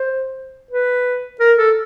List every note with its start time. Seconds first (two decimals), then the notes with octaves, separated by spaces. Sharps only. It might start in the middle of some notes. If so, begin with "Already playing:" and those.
Already playing: C5
0.71 B4
1.40 A#4
1.58 A4